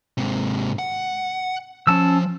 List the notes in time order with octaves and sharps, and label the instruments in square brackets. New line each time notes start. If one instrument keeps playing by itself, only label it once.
[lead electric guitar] G#2 C3
F#5
[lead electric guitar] F3 [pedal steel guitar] C#4 A5 E6